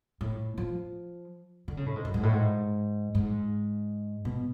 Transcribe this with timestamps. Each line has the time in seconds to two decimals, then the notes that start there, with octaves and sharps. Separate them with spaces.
0.21 A2
0.58 F3
1.68 D3
1.77 C#3
1.86 A2
1.96 G#2
2.05 F#2
2.14 G#2
2.23 A2
2.32 G#2
3.15 G#2
4.25 B2